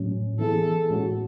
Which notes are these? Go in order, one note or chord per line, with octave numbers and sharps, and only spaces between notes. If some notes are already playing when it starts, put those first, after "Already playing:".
Already playing: A2 F#3 C#4
E3 B3 E4 G#4 A4
A2 G#3 C#4 F#4